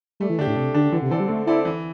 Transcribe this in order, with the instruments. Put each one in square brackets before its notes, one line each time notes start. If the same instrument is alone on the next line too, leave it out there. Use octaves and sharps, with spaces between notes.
[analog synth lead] G3 [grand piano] A3
[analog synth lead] E3
[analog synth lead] D3 [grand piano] D4 G4
[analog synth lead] A2
[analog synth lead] C3 [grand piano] A3
[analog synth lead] D3 [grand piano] D4 G4
[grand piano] D3 [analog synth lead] E3
[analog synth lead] C3
[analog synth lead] E3 [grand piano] C4 A4 D5
[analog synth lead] G3
[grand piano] D3 [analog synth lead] A3
[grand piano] C4 A4 D5 [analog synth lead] E4
[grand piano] E3